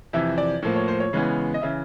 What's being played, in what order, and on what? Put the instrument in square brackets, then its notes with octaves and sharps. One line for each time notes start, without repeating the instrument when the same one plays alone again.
[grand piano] F2 C3 E3 E5
D5
A2 F3 A#3
C#5
C5
C#5
C#3 E3 G#3 B3
D#5
C#3 E3 E5